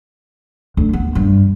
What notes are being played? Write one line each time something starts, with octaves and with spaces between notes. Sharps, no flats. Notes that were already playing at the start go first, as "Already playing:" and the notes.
D2
B3
G2